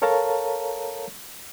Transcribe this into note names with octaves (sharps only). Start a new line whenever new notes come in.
A4 A#4 C#5 F5 A5 A#5